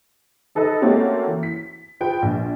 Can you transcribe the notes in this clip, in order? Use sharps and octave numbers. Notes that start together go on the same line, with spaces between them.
D#4 A4 B4 D#5
A3 A#3 C4 C#4 F#4
E3
B6
F4 G#4 B4 G5
A#1